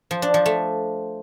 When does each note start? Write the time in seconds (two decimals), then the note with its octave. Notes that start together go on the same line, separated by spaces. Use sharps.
0.11 F3
0.22 D4
0.34 F3
0.46 A3